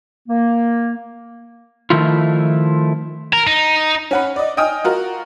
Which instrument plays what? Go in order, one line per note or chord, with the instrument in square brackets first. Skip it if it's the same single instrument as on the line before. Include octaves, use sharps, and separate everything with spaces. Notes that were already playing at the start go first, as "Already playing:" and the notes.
[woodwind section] A#3
[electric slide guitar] D#3 F3 A3 E4 F4
[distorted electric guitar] A#4
D#4
[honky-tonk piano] C#4 F#5 B5
D5 D#5
D#5 G5 G#5 D#6 F6
F4 F#4 A#4